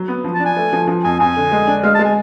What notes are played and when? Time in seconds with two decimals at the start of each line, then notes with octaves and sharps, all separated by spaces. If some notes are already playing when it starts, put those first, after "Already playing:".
Already playing: F#3
0.08 B3
0.24 F3
0.35 A5
0.40 D4
0.45 G#5
0.57 A3
0.73 F3
0.87 F3
1.04 F2 G#5
1.20 F2 G#5
1.36 D3
1.52 G#3
1.67 D4
1.83 G#3 F5
1.94 A5
1.99 G#3
2.05 G#5